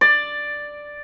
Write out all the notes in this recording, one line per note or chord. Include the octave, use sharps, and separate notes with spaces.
D5